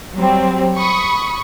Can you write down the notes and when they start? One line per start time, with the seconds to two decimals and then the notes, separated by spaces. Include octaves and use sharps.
0.14 F#3 G3 C4
0.78 B5 C#6 D#6